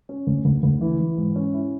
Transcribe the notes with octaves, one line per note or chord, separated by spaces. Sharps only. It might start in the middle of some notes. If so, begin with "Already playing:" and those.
C#4
D2
D2
D2
E3
E3
G#2
C#4
E4